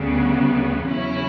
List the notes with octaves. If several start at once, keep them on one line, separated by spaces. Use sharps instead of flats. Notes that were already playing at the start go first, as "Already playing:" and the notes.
Already playing: D2 C#3 G3 B3
E2 C#3 F#3 C#4 E4